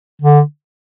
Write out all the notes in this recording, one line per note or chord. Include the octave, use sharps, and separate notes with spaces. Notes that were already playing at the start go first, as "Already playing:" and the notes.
D3